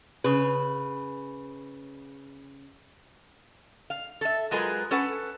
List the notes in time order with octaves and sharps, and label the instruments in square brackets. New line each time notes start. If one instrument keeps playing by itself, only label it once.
[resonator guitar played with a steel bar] C#3 B4
F5
A4 E5
F#3 G#3 F4 G#4 A#4 B4
C#4 A4 B4 F#5